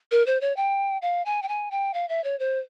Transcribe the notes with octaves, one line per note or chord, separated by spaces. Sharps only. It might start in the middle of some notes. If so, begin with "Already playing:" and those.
A#4
C5
C#5
G5
F5
G#5
G5
G#5
G5
F5
E5
C#5
C5